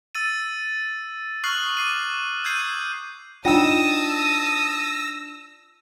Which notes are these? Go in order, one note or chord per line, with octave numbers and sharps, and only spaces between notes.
E6 A6 D#7
C#6 D#6 F6 F#6 C7 F#7
D6 C7 D#7
E6 G6 G#6 C7 D#7
D4 D#4 F4 G5 A5 D#6 E6 A#6